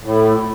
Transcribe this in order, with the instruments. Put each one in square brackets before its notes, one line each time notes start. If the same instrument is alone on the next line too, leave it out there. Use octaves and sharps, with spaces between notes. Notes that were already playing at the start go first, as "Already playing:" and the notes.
[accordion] A2